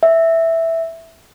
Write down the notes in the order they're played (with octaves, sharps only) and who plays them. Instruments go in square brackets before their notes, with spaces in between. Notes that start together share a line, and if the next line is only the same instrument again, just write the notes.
[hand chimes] E5